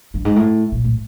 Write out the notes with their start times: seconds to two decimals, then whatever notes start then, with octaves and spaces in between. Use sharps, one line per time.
0.14 G2
0.25 G#2
0.36 A2
0.72 A#2
0.84 A2